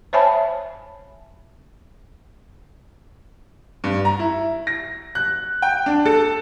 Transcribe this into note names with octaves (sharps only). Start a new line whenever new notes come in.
C5 C#5 E5 G#5 A5 B5
G2
A#5
E4
A#6
F#6
G5
D4
A4